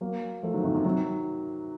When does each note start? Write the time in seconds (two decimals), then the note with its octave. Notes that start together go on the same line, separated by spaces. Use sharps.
0.01 F#3 A#3
0.43 F3 A3
0.53 D#3 F#3
0.64 C3 D#3
0.75 C3 D#3
0.85 D#3 F#3